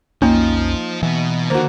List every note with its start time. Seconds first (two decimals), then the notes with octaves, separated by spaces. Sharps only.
0.22 B1 F2 F3 A#3 C#4 D#4
1.03 B2 E3 F#4
1.50 D3 D#3 A#3 F#4 C5